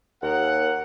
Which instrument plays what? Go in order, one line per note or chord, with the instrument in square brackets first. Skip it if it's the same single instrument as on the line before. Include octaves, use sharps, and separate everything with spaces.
[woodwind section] D#2 [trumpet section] A#4 F#5